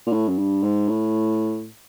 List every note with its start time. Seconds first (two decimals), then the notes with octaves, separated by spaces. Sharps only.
0.06 A#2
0.12 A2
0.28 F#2
0.38 G2
0.63 G#2
0.89 A2